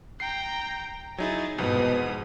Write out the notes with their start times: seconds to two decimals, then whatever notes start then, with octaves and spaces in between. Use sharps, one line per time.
0.20 G5 A#5 C7
1.18 F#3 D#4 E4 G#4 A6
1.58 C2 F2 G#2 B2 D#6